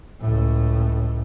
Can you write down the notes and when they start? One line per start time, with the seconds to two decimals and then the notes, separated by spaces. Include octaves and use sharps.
0.20 C#2 A2